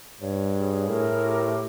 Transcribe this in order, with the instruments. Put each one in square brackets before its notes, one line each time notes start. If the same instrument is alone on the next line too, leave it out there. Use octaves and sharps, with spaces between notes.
[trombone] G2 [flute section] C#5
[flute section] G#4
[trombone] A2 [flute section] A#4
[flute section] G4